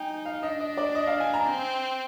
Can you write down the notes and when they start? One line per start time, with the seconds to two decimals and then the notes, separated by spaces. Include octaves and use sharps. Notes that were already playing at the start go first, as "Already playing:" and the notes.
Already playing: D#4 G5 G#5 A#5
0.25 F5
0.43 D4 D#5
0.60 D#5
0.77 D5
0.95 D#5
1.07 F5
1.20 G#5
1.34 A#5
1.47 C4